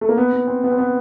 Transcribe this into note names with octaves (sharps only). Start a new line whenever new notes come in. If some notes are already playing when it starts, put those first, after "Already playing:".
A3
A#3
B3
B3
C4
B3
C4
B3